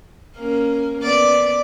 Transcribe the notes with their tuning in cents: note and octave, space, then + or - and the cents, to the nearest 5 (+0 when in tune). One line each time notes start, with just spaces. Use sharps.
A#3 +0 C#4 +0 A#4 +0
B3 +0 D5 +0